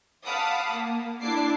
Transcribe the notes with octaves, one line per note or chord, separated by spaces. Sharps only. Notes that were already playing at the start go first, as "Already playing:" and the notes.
F5 F#5 A5 B5 D6 D#6
A#3
D4 E4 A5 D6 C7